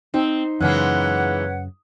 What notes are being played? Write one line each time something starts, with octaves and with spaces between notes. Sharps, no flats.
C4 D#4
F#2 C#3 E3 G#3 A#3 B4 C#5 F#5